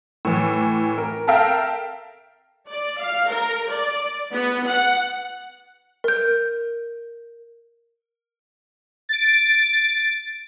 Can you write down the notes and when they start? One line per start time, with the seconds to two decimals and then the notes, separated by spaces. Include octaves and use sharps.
0.25 A2 E3
0.98 A#4
1.27 A4 A#4 E5 F5 G5
2.69 D5
2.99 F5
3.30 A#4
3.71 D5
4.33 B3
4.67 F#5
6.04 A#4 G6
9.09 A6 D7